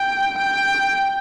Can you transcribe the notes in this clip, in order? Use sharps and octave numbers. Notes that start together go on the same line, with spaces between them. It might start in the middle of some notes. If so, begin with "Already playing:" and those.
Already playing: G5
G5